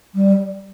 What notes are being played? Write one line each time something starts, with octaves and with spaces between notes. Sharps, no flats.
G3